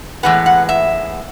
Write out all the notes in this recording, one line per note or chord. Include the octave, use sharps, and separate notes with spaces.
A2 E3 G#3 B3 F#5
F#5
E5